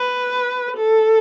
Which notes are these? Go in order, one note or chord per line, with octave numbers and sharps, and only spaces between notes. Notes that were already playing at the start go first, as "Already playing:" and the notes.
Already playing: B4
A4